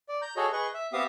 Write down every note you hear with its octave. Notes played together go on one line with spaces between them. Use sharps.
D5
A#5 G6
F#4 G#4 A4 C#5 D#5
G#4 B4 D#5 C#6
E5
B3 C4 G4 E5 F5 D#6